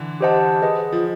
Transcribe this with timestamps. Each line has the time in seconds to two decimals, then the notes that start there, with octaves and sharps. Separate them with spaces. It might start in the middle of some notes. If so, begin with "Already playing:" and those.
Already playing: D3 E3
0.21 G4 C5 D#5 F#5 A5
0.62 G#4 B4 D#5 F#5
0.92 F3